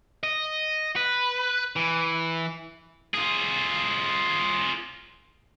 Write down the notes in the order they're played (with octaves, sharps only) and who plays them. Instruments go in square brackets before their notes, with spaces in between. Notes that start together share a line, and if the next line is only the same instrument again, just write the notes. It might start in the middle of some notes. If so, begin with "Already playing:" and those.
[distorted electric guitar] D#5
B4
E3
F4 G#4